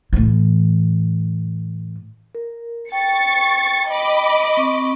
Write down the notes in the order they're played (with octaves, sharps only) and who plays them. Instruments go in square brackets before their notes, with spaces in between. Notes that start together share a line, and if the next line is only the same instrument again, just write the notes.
[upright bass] A2 E3
[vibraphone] A#4
[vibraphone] G5 [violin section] C#6 A6 C#7
[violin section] D#5 B5 D6
[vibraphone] C4 C#6